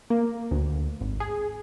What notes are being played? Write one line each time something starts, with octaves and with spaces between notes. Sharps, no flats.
A#3
D2
G#1
G#4